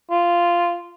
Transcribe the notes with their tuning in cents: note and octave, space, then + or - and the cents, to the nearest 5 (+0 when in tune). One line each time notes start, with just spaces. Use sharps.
F4 -10